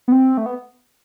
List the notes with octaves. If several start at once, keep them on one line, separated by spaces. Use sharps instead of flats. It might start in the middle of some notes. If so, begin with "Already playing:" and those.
B3
C4
A3
B3